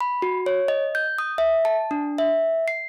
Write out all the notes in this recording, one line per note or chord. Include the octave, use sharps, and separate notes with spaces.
B5
F#4
C#5
D#5
G6
D#6
E5
A5
D4
E5
C7